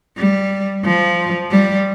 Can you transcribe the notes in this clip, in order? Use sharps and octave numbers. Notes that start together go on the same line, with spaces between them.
G3
F3
G3